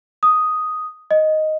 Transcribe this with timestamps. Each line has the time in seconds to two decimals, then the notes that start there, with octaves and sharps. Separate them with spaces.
0.23 D#6
1.11 D#5